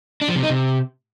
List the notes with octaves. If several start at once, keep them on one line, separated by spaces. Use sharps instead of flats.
D4
F3
C3
D#4
C3